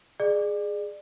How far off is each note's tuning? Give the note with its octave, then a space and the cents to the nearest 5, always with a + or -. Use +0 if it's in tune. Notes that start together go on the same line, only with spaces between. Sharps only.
G#4 +0 D5 +30